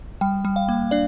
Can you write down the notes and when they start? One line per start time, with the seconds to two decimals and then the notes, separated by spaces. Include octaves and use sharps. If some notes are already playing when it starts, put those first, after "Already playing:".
0.21 G3 G5
0.45 G3
0.56 F5
0.69 A#3
0.91 D4 D5